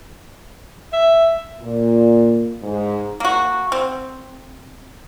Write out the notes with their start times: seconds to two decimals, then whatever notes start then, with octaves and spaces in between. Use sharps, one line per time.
0.93 E5
1.61 A#2
2.62 G#2
3.20 A#3 F#4
3.72 C4